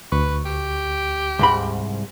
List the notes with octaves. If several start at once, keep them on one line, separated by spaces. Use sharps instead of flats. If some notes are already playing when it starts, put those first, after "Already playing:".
D2 B4 C#6
G4
C2 G#2 B5